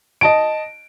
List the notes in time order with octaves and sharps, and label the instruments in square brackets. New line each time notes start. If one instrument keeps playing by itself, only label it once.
[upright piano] D#5 A5 D7